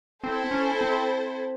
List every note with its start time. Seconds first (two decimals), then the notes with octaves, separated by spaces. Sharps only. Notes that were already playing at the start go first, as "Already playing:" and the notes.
0.23 C4 E4 A4 C5
0.51 C#4
0.81 C4